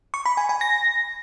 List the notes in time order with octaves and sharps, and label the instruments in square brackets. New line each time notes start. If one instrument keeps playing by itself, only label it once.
[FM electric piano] C#6
B5
G#5
G#5
A#6